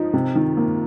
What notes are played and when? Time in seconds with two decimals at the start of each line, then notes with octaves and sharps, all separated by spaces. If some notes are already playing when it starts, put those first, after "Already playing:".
Already playing: F3 D#4
0.13 C3
0.35 D#3
0.57 A#3